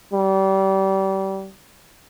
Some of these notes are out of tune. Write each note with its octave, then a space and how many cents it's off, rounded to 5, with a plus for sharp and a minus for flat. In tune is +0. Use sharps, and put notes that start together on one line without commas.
G3 -30